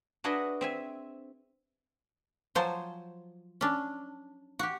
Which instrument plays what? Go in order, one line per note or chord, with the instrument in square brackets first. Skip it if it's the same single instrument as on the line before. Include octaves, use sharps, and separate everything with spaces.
[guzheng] D4 F#4 G#4 B4 D#5 E5
C4 E5 G#5
[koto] F3 F#3 C5 G#5 A5
C#4 D4
F#4 G4